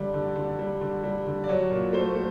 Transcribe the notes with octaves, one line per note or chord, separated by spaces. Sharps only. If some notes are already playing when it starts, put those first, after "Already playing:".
Already playing: D3 G3 D5
D3
D3
G3
D3
G3
D3
D5
F#3 C#5
A#2
A3 C5
A3